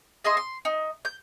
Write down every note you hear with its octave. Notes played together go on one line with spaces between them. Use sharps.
G#4 D#5 E5 C6
C6
D#4
G6